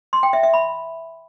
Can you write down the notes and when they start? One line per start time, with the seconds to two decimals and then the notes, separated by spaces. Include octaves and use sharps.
0.13 C6
0.23 G5
0.33 E5
0.43 E5
0.53 B5